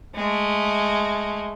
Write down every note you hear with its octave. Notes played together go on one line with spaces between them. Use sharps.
G#3 A3